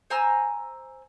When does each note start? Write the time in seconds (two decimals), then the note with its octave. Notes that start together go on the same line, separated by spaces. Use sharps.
0.10 C5 G#5 A#5 E6